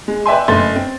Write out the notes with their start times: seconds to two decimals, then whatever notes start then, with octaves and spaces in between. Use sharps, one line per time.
0.08 G#3
0.26 B4 D5 E5 G5 G#5 C6
0.48 F#1 A3 B4 C6 A6
0.76 C4